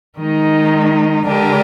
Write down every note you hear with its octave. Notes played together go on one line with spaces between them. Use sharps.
D#3 G#3 D#4
D3 G#3 D4 G4 A#4